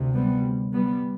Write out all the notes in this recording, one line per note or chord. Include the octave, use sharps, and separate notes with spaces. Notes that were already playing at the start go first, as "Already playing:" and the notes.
Already playing: D2 C3
G3 B3
G3 B3